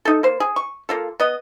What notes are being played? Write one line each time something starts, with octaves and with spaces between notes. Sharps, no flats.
D#4 A4
A#3 C5
G#4
C#6
A#3 F4 A4
B3 D#5